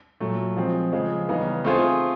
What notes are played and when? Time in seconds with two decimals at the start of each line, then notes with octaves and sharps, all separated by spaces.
0.20 A#2 F#3 A3
0.56 F3 G#3 C4
0.92 C#3 F3 G#3
1.29 C#3 E3 G3 B3 D#4
1.64 A3 C4 F4 G#4 C5